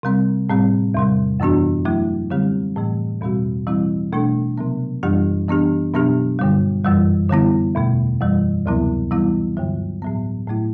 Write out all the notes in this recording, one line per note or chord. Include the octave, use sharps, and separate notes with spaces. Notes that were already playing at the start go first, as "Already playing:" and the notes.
C3 G3 C4
A2 G3 C4
E2 C3 G3
F#2 E3 B3 D4 F#4
F#3 A3 E4
D3 G3 C4 G4
A2 E3 A3
E2 B2 G3 C4 F#4
E3 G3 C4 E4
B2 A3 D4 A4
C3 F#3 B3
F#2 E3 G3 D4 G4
E3 B3 D4 G4
B2 F#3 B3 D4 G4
G2 D3 G3
F#2 E3 G3
D3 G3 B3 E4
E2 B2 A3
F#2 E3 G3
D2 C3 F#3 B3 E4
E3 G3 B3 E4
G2 D3 F#3
A2 F#3 B3
A2 F#3 A3 E4